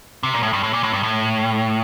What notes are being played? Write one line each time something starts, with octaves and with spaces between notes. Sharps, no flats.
C3
A#2
A2
G2
A2
A#2
A2
G2
A2